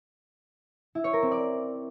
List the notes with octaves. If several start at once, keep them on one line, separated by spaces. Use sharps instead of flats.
E4
C#5
A#4
C4
D5